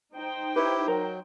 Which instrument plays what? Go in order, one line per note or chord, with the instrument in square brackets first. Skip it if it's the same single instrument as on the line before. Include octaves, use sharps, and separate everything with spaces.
[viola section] D#4 C5 G5
[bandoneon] E4 G4 [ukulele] B4 C#5
[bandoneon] F#3 [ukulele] A#4